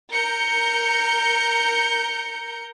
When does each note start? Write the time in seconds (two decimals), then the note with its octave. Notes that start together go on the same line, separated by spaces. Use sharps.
0.13 A#4 G6 C#7